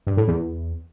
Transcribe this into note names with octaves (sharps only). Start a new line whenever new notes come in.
G2
A2
E2